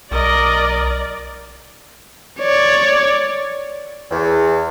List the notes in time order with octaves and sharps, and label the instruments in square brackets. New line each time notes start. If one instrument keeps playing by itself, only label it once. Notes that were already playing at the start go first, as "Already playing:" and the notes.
[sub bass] B1 [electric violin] A#4 D#5 [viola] D5
[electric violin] C#5 D5
[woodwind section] E2